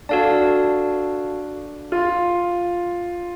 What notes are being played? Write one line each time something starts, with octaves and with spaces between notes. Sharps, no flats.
D4 F#4 A4 F5 A5
F4